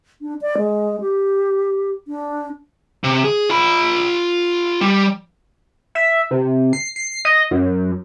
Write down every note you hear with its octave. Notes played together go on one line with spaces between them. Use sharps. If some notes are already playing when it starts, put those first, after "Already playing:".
D4
D5
G#3
G4
D4
C3
G#4
F4 B5
G3
E5
C3
C7
C7
D#5
F#2